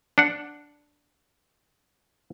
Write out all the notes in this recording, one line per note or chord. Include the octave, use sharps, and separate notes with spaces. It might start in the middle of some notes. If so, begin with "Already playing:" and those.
D4 F#5